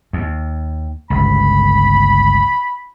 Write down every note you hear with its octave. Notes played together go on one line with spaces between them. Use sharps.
D#2
G1 C#2 B5